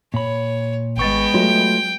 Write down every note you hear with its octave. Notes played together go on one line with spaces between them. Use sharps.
A#2 C#5 B5
G#1 G#3 B3 G5 C#6 A6
F#3 A3 F4 F#4